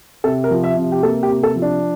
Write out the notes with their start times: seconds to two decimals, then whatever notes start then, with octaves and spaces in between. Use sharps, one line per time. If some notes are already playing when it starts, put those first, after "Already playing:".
0.24 C3 A4
0.44 A#4
0.51 F3
0.64 E5
0.77 C3
0.92 G4
1.03 A#3 A4
1.23 G4
1.29 C3
1.43 A4
1.56 F3
1.62 D4